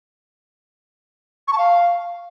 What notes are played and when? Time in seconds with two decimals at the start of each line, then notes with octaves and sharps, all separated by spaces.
1.48 C#6
1.53 A5
1.58 F5